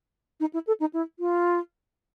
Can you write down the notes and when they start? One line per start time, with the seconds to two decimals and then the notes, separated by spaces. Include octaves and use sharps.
0.40 D#4
0.54 E4
0.67 A4
0.80 D#4
0.94 E4
1.20 F4